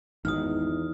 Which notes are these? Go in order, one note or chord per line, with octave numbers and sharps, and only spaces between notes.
G#1 E2 D3 F#3 D#4 D#6 F6